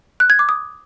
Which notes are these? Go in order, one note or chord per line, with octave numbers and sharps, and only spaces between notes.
F#6
G#6
D6
D#6